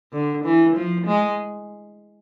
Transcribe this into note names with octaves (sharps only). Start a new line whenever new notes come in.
D3
E3
F3
G#3